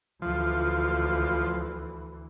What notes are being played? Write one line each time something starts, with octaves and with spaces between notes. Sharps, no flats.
D2 E3 F3